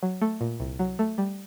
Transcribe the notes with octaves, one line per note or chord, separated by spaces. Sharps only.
F#3
A3
A#2
C2
F#3
A3
G3